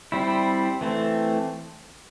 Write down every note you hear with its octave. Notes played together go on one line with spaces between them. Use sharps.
G3 C4 E4
E3 A3 C4